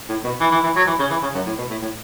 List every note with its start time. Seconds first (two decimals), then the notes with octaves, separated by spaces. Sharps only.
0.09 A2
0.24 B2
0.41 E3
0.51 E3
0.64 E3
0.76 F#3
0.87 E3
0.99 C#3
1.10 E3
1.22 C#3
1.34 F#2
1.46 A2
1.58 B2
1.70 A2
1.82 A2